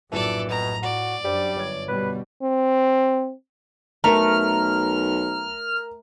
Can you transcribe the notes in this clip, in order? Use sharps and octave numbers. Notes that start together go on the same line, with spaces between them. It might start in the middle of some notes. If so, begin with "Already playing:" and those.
A#1 F#2 A2 E3 A4 D5 A5
B2 A#5
F#4 D5
F#2 G3 D4 C5
G1 C#5 G#6
B2 G3 B4
C4
B1 A3 A#4 A#5 F6